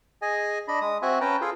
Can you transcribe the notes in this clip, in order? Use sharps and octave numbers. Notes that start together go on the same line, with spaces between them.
G#4 D#5 G#5
D4 D#5 B5
G#3 D#6
C4 F#4 E5 F#5 G#5
C#4 B4 G5 A5 A#5
F4 G#4 A4